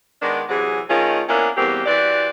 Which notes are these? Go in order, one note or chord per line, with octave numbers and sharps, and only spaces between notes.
D#3 G#3 B3 D4
C3 E3 F#3 G#4
D#3 A3 C#4 D#4 F4 G#4
A#3 B3 C#4 D4 E4 A#4
E2 B2 G3 A#3 C4 G4
E3 F#4 G4 C5 D5